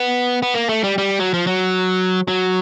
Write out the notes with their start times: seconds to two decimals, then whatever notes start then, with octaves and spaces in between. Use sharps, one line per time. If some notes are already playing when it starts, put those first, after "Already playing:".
Already playing: B3
0.42 B3
0.55 A#3
0.69 A3
0.84 G3
0.98 G3
1.20 F#3
1.34 F3
1.47 F#3
2.28 F#3